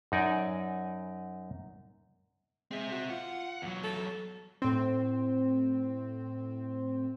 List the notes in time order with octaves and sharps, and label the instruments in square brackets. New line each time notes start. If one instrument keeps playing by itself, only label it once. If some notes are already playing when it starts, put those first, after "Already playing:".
[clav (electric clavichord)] F#2 D#4 D5 G#5
[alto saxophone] G#3 [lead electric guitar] C4 E5
[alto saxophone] F#4
[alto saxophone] F4 [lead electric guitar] F#5
[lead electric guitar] E2 F#3
[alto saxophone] A4
[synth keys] A2 C4